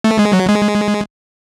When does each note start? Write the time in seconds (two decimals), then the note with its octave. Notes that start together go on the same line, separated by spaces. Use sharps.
0.04 A3
0.19 G#3
0.33 F#3
0.49 G#3